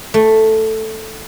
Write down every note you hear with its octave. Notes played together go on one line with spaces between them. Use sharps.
A3